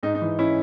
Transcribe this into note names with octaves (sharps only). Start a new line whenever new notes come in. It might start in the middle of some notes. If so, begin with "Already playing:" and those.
G#2 D#4
D#4
E3
C#4 E4